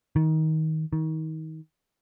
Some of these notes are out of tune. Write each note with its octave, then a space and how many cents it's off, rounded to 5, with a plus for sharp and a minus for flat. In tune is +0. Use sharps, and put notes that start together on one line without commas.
D#3 +20
D#3 +30